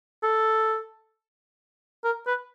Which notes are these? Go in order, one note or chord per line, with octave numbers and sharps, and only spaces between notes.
A4
A#4
B4